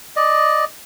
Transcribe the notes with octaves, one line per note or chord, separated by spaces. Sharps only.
D5 D#5